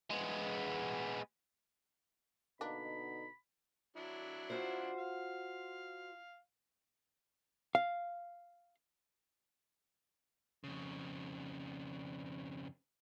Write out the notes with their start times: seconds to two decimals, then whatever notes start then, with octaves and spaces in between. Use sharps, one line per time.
0.10 G#3 B3
2.61 B2 D3 A#3 D4 D#4 B5
3.97 F#3 D4 E4
4.50 F4 F#4 C5
4.99 F5
7.75 F5
10.64 F2 C#3